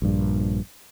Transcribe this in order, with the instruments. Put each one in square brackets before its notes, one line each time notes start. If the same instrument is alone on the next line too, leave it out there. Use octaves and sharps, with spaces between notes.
[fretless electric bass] A#1 G2